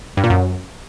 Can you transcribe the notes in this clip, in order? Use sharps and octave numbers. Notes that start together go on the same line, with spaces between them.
G2
A#2
F#2